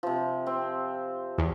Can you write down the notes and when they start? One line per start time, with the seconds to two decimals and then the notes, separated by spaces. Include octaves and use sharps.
0.03 C3 F3
0.46 C4
1.38 E2 G#4